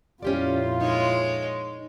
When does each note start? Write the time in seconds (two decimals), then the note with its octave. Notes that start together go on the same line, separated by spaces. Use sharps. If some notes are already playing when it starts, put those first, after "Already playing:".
0.22 F2 A#2 C#4 E4 F4 G4 D5
0.81 G#3 D#4 C#5